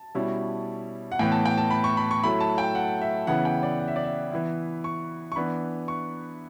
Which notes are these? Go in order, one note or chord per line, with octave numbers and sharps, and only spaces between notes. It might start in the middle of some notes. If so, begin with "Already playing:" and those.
Already playing: A5
B2 G3 C#4 E4
F#5
A2 E3 B3 G5
A5
G5
A5
B5
C#6
B5
C#6
F#3 A3 E4 B5
A5
G5
F#5
E5
C#3 E3 B3 E4 F#5
G5
D5
F#5
E5
D5
E5
E3 B3 E4
C#6
C#6
E3 B3 D4 B5
C#6